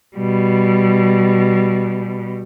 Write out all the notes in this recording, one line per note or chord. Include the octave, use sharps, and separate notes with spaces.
B2 G3